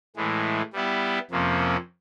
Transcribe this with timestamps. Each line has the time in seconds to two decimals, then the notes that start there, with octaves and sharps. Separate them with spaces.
0.16 A2 E3 G#3
0.73 G3 B3 E4 G4
1.31 F2 C3 F3 A#3 C#4